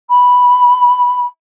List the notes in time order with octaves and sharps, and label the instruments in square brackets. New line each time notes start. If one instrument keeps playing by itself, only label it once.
[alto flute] B5